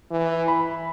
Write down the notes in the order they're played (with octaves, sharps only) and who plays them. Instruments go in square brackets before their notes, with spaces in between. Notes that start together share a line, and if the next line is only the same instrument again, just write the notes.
[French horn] E3
[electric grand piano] B5